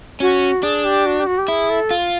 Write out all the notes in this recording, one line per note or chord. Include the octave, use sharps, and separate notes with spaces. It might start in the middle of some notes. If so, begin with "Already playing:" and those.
C#4 F#4
D4 G#4
G4
F#4
G4
F#4
G4
E4 G#4
A4
F4